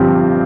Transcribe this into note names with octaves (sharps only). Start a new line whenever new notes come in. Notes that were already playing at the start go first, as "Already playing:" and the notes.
Already playing: G1 G2 F3 C4 G4